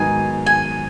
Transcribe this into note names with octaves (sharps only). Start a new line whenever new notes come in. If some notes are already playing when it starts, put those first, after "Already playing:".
Already playing: G#2 D#3 F#3 B3 D#4 G#5
G#5